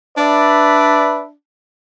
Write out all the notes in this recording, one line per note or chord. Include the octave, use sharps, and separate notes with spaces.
D4 B4 D5 E5